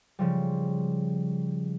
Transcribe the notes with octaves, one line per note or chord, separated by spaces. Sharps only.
C#3 F3 G3